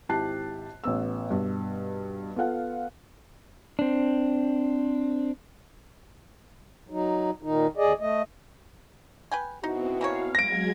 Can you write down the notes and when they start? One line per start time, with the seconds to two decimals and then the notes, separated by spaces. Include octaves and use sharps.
0.09 G#1 E4 G4 A5 F#6 C7
0.84 A1 B3 E6
1.30 G2 B2
2.36 B3 F4 A4 F5 F#5
3.79 C4 D4
6.90 F#3 D#4
7.43 A#2 D#3 D#4
7.77 D#2 G#4 D5 D#5
8.00 A3 D#5
9.32 B4 G5 G#5
9.64 B2 B3 C4 D#4 E4 F#4
10.01 E3 A#3 C#5 F5
10.35 F#3 G#3 G#6 A#6 D7